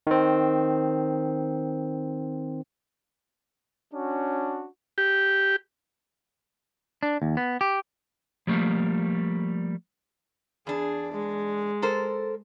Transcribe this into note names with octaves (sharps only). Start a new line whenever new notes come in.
D#3 C4
C#4 D4 F#4
G4
D4
D#2
B3
G4
F3 G3 A3 A#3
E2 D4 G#4
G#3
A4 A#4 C5